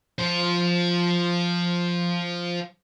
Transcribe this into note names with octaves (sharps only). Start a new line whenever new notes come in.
F3 C5